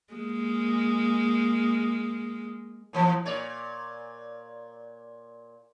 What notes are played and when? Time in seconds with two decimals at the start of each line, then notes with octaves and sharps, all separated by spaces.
0.13 G#3 A#3
2.93 A#2 E3 F3
3.25 A#2 C#5 D5